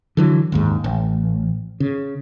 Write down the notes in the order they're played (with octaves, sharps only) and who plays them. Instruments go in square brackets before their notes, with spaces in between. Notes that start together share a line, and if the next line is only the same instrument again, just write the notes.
[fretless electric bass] D3 E3 F#3
F#1 D#2 G#2
A1
C#3